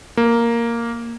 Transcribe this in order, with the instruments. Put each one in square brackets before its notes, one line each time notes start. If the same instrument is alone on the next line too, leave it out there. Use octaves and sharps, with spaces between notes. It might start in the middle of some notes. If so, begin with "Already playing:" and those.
[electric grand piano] A#3